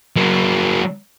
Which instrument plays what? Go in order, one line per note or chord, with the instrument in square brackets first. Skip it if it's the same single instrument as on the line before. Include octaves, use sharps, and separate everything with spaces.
[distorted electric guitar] F#3 A#3